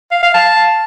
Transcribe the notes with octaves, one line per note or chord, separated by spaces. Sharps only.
F5
F5
A5